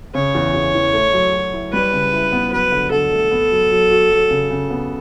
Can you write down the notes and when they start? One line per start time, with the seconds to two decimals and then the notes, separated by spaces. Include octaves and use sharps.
0.15 C#3 C#5
0.35 E2
0.54 E2
0.75 E3
0.94 A3
1.13 F#3
1.33 F#3
1.53 E4
1.73 G3 B4
1.93 C#3
2.13 E4
2.32 B3
2.52 F#3 B4
2.72 D3
2.91 D3 A4
3.12 A3
3.31 B3
3.52 F#3
3.72 F#3
3.91 F#4
4.10 F#3
4.30 C#3
4.50 C#3
4.70 B3